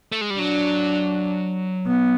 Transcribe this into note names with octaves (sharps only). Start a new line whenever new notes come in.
A3
G#3
G3
F#3 D4
B3